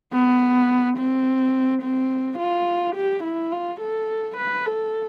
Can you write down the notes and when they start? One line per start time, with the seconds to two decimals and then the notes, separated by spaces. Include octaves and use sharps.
0.13 B3
0.98 C4
1.83 C4
2.39 F4
2.96 G4
3.24 E4
3.52 F4
3.81 A4
4.37 B4
4.66 A4